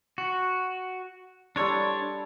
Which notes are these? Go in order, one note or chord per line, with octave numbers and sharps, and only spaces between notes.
F#4
G3 D4 A4 C#5 C6